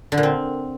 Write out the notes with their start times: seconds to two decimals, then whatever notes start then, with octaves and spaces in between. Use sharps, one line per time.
0.12 D3
0.17 A#2
0.23 C4